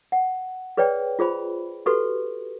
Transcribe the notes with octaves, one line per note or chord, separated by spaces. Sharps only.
F#5
G#4 B4 C#5 D5 G5
F4 G#4 C5 B5
F#4 G4 A4 B4 C#6